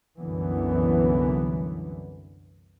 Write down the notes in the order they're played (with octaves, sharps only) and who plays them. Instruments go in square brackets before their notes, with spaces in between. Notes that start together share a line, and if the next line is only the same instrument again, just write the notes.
[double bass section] C2 F#2 D3 E3 B3